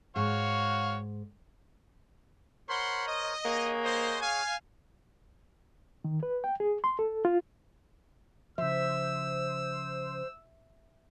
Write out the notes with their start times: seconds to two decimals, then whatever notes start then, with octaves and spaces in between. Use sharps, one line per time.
0.16 G#2 F#4 C#5 F5
2.69 A#4 C5 C#5 F#5 B5 C6
3.07 D#5
3.45 A#3 G#4 C#5 F#5
3.83 C5 D#5
4.21 F5 G#5
6.04 D#3
6.23 B4
6.44 G5
6.60 G#4
6.84 C6
6.99 A4
7.25 F4
8.58 C#3 F3 C5 E5 E6